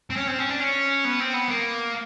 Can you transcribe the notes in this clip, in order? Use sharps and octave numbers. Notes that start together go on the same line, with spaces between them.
C4
C#4
C4
C#4
D4
C#4
B3
C4
B3
A#3